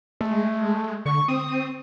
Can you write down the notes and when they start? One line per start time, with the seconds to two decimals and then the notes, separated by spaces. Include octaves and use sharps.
0.21 G#3 A3
1.06 D3 C#6
1.28 C4 D#6